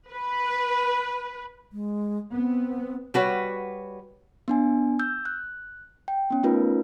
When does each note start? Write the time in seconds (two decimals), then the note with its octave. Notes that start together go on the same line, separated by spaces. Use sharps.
0.11 B4
1.73 G#3
2.32 B3 C4
3.14 G3 F#4 B4 C#5
4.48 B3 D4 G#5
4.99 E6 G6
5.25 F#6
6.08 G5
6.30 B3 C#4
6.43 A3 C#4 D#4 F4 A#4 B4